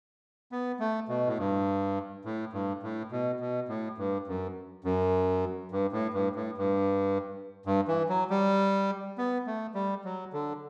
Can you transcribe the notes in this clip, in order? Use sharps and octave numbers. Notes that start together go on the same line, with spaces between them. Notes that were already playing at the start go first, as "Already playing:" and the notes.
B3
A3
B2
A2
G2
A2
G2
A2
B2
B2
A2
G2
F#2
F#2
G2
A2
G2
A2
G2
G2
E3
F#3
G3
B3
A3
G3
F#3
D3